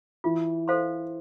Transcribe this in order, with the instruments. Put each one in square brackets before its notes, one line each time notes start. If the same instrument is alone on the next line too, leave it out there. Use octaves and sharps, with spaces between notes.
[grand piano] E3 [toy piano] F4
[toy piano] A4 C5 F5 C6